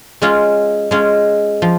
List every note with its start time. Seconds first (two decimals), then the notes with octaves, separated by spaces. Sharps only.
0.22 G#3 C#4 F4
0.91 G#3 C#4 F4
1.62 F3